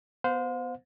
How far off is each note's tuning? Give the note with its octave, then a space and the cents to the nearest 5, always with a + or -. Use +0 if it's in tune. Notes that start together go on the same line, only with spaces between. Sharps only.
B3 +10 C5 -20 F5 +45